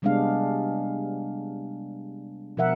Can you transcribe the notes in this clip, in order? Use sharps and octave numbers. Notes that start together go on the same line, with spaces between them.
C3 G3 G#3 B3 D4 F5
B2 F3 A#4 E5 F#5